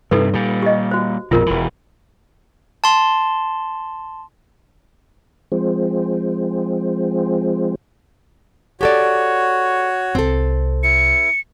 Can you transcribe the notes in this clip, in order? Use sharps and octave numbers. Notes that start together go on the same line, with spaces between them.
G2 C3 D#4 A4 B4
A#2 G3
G4 D#5
F#4 C5
A#1 F2 B2 F4 A#4
E1 E3
A5 C6
F3 G#3 C4
F#4 G4 A4 C#5 D5
C2 C4 A4
E4 C#7